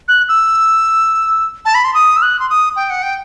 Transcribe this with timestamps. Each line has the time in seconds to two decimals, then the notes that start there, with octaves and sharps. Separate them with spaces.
0.08 F#6
0.29 E6
1.65 A5
1.75 B5
1.84 C6
1.94 D#6
2.17 E6
2.22 F#6
2.40 C6
2.50 D#6
2.76 G5
2.90 F#5
3.03 G5